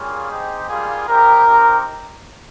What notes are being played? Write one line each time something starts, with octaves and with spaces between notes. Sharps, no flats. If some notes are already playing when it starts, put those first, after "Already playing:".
Already playing: G3 A#3 C#4 F4 G#4
C4 D#4 G4
G3 A#3 F4 G#4
G3 C4 D#4 G4 A#4
C4 D#4 G4